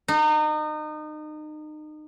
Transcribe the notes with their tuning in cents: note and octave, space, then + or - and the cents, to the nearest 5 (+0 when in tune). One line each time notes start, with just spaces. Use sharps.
D#4 -30